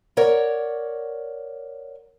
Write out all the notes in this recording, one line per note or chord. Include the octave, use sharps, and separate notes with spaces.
A#4 C#5 D5 F#5